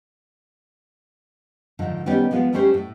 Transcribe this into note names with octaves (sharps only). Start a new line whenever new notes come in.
G#2 D3 D#3 F3
D#3 G3 B3 C#4 D#4 G4
F3 G#3 B3 F4
E3 G3 A3 C#4 G4 C5
A2